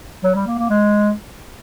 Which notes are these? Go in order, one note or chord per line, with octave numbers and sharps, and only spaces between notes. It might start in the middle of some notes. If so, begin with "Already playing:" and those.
F#3
G3
A#3
A#3
G#3